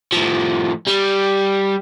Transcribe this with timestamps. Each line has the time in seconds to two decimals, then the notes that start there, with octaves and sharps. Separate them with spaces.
0.12 A2 F3
0.87 G3